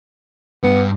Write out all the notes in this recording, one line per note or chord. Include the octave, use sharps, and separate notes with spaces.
G2 B3